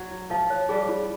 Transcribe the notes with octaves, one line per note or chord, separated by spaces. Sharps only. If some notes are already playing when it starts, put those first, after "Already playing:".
Already playing: F#3
F4
F3 F5
C#5
G3 G#4
F4